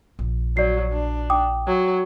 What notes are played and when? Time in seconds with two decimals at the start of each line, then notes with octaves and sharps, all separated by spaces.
0.19 A#1
0.57 F#3 D5 C7
0.93 D4
1.30 G5 D6 D#6
1.67 F#3